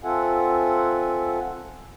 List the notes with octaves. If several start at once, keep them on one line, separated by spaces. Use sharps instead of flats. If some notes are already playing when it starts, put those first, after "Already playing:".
C4 F4 A4 E5 F#5 G#5